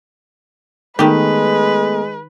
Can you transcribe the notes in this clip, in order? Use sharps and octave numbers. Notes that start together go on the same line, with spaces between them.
D#3 G#3 A3 B3 G4 A4 B4